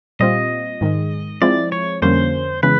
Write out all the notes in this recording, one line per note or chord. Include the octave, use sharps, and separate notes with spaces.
A#2 G3 C4 F4 D#5
G#2 D#3 G#3
F3 G#3 C4 E4 D5
C#5
F2 D3 G3 A#3 C#4 C5
C#3 E3 G#3 B3 B4